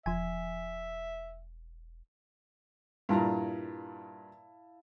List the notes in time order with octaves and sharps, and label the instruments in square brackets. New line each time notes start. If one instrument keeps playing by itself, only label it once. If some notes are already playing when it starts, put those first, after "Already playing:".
[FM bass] E1 [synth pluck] F3 G#5 [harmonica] E5
[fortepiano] G2 A#2 A#5 [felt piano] E4 F5 A5